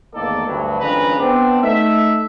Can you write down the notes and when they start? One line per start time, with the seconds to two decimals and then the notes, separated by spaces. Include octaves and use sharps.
0.14 E2 A2 D#3 A#3 A4 D5
0.46 D2 G2 F#3
0.80 G#1 F2 C#3 D4 B4 A#5
1.19 B3 C4 D4
1.62 A3 D#4 E5